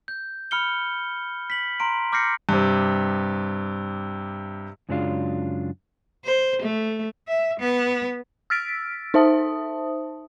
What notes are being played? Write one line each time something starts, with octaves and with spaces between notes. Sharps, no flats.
G6
B5 F6 C#7 G7
B6 F#7
A#5 C6 D7
D6 F6 G6 A#6 C7 C#7
G2 C3
F#2 C#3 F#3 G#3 D4 F4
C5
A3
E5
B3
E6 F6 A6 B6 D7
D#4 C5 E5 A5 D#6